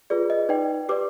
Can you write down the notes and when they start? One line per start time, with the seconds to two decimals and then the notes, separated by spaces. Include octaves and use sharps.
0.10 F4 G#4 B4 D5
0.30 D#5
0.49 D#4 B4 D5 G5
0.89 G4 B4 D5 D6